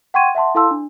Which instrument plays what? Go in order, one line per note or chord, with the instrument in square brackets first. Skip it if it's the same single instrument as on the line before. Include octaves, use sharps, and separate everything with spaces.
[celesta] F#5 G5 C6 C#6 G#6 D#7
E5 F#5 A5 C6
E4 A4 F5 A5 C6 E6
D4